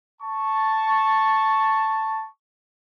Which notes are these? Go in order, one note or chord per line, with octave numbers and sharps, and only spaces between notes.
A5 C#6